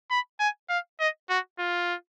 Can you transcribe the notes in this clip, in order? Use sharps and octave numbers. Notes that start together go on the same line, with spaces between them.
B5
G#5
F5
D#5
F#4
F4